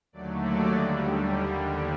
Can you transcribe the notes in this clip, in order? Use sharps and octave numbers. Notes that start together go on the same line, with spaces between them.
D#2 D3 F#3 A3 D5
D5
D#2 D3 G3 D#5